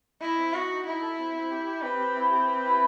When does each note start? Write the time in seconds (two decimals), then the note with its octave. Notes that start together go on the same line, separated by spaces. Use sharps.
0.21 E4 D#5
0.38 C4
0.53 F#4 D#5
0.70 D#4
0.86 D#4 E4
1.01 A4
1.19 C4
1.34 C4
1.51 G4
1.66 G4
1.83 C4 B4
1.99 G4
2.16 E4
2.32 G4
2.47 B4
2.64 E4